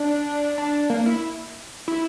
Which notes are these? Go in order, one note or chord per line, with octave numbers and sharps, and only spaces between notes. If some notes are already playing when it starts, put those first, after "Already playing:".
Already playing: D4
D4
A#3
E4
E4